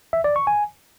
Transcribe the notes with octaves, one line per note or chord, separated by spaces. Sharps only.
E5
D5
C#6
G#5